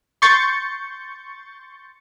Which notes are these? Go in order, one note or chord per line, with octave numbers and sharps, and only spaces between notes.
C6 C#6 G6 A6 C#7